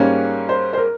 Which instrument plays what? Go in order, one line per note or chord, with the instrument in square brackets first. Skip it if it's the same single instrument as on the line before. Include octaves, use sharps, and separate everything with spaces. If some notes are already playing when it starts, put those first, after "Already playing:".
Already playing: [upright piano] G#2 G3 A#3 C#4 C#5
C5
C5
A#4